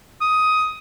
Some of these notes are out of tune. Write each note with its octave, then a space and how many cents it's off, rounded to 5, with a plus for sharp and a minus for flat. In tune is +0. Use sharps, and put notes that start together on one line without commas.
D#6 +10